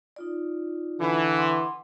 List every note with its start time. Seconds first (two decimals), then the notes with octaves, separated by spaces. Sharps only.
0.16 D#4 F4 D5
0.99 D3 E3
1.37 F#5 C6 D6